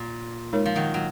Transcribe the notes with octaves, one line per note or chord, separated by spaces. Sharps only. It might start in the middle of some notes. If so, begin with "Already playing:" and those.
Already playing: A#2
G#3 D#4 A#4 C#5
F3
D#3 F#3
F#3